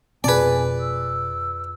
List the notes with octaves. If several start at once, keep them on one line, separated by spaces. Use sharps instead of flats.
F1 F2 B2 C4 G#4 B4 D5 G#5
E6